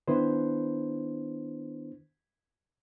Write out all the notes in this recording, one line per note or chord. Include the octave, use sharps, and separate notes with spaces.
D#3 B3 D4 E4 B4 C5